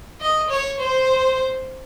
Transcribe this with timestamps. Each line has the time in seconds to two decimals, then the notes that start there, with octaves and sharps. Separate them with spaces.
0.21 D#5
0.50 C#5
0.79 C5